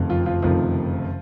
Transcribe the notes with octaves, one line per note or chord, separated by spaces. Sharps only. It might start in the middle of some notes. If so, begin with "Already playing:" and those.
Already playing: F#1 F2 C3 D#3 A3
F3 F4
F3 F4
F#1 F2 C3 D#3 F3 A3 F4